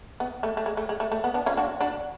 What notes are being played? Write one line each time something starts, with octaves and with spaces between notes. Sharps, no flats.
B3
A3
A3
G#3
A3
G#3
A3
A3
B3
B3 D4
C#4 F4
D4 F#4
D4 F#4